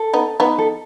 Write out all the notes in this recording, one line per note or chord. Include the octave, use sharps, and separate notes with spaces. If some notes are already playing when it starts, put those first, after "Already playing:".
Already playing: A4
B3 D#4
B3 D#4 B4
A4